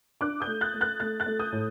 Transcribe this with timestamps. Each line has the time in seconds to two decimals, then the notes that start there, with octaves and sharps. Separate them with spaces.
0.21 D4 D6 F#6
0.40 D#6 G6
0.47 A3
0.61 F#6 A6
0.74 A3
0.81 F#6 A6
1.00 A3 F#6 A6
1.20 F#6 A6
1.26 A3
1.39 D#6 G6
1.53 A2